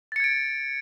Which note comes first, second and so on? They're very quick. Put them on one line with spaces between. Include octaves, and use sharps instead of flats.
A6 C#7 G#6 D7